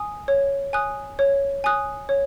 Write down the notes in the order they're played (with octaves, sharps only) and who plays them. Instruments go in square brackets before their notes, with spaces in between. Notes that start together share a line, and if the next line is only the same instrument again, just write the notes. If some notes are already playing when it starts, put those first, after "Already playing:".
Already playing: [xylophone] G#5 D#6
C#5
G#5 D#6 F#6
C#5
G#5 D#6 F#6
C#5